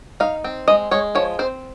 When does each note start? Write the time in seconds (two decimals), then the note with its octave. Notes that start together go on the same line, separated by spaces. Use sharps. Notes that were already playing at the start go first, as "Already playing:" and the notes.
0.20 D#4 F5
0.44 C4
0.68 G#3 D#5
0.91 G#3 C#5
1.15 F3 C#5
1.39 C4 C5